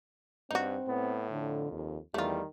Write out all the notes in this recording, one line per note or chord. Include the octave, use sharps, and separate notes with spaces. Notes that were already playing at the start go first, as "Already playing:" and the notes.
G2 C4 D#4 F#4
A2 B3
F2 D3
D#2
E2 D#3 G3 A3 F4